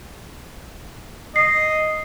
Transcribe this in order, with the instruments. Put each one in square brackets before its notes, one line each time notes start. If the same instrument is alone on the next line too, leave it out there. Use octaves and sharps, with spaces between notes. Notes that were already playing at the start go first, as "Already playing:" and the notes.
[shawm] D#5 [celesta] C7